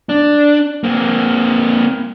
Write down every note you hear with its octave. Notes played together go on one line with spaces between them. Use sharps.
D4
A#3 C4